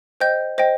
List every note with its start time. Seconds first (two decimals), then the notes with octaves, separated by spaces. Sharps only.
0.20 C5 D#5 G5 G6
0.58 C5 D#5 G5